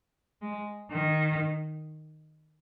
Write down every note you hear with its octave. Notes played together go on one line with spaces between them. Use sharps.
G#3
D#3